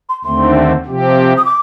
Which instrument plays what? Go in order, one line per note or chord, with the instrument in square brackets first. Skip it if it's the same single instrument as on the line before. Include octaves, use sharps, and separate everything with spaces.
[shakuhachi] C6
[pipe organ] D#2 D3 A3 C4 [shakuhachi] C6
[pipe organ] C3 F3 C4 G4
[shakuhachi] D#6
D6